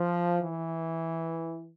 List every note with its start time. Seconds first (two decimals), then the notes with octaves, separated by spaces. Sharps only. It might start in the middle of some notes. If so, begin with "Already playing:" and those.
Already playing: F3
0.42 E3